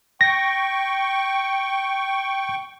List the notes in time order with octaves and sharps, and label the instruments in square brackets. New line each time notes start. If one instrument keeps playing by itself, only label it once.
[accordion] G5 C#6 [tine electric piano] A#6